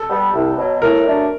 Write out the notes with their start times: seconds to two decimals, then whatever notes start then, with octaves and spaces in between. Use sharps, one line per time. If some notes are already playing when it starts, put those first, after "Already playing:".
Already playing: A4
0.10 G3 B3
0.34 C2
0.57 B2 F#3
0.82 A2 A#4
1.06 F#3 A3 D4